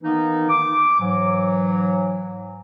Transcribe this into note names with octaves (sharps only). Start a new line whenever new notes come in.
D#3 E3 A#3 B3 D#4
D6
G#2 E3 F#3